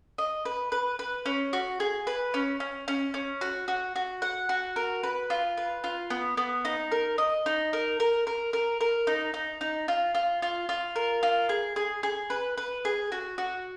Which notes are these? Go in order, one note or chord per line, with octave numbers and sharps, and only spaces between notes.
D#5
B4
B4
B4
C#4
F#4
G#4
B4
C#4
C#4
C#4
C#4
F#4
F#4
F#4
F#5
F#4
A#4
B4
F4
B4
F4
B3
B3
D#4
A#4
D#5
D#4
A#4
A#4
A#4
A#4
A#4
D#4
D#4
D#4
F4
F4
F4
F4
A#4
F4
G#4
G#4
G#4
B4
B4
G#4
F#4
F#4